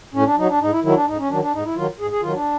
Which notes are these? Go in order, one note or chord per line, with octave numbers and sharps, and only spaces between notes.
A2 C#4
D4
F#3 D#4
D4
G#2 D#4
E4
D#3 F#3 E4
D4
G#2 D#4
C#4
D#3 F#3 D4
D4
G#2 D#4
E4
D#3 F#3 F4
G#2 G#4
G#4
D#3 F#3 F4
D4